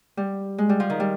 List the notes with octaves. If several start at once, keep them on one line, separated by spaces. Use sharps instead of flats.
G3
G#3
G3
F3
D#3
G3